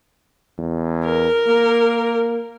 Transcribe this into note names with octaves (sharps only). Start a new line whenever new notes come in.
E2
A#4
A#3